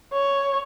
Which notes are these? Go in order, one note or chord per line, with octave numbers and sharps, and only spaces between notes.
C#5